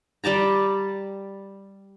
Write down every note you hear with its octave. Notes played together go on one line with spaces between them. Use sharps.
G3 G4 A5 A#5